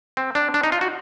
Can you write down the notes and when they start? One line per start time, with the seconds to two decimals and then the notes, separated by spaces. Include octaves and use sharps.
0.17 C4
0.35 D4
0.54 D4
0.63 D#4
0.72 F4
0.81 F#4